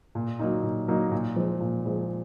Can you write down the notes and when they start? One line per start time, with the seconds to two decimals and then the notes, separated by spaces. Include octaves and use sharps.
0.15 A#2
0.39 F#3 A#3 D#4
0.63 A#2
0.88 F#3 A#3 D#4
1.12 A#2
1.36 F3 G#3
1.60 A#2
1.85 F3 G#3